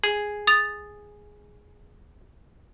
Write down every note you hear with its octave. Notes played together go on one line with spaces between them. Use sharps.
G#4
D#6 A6 F7